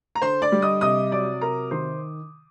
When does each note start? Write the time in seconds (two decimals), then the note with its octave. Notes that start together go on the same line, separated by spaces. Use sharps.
0.15 A#5
0.22 D3 C5 C6
0.42 D5 D6
0.52 G3
0.62 D#5 D#6
0.81 C3 D#5 D#6
1.12 F#3 D5 D6
1.41 C3 A#4 A#5
1.71 D#3 C5 C6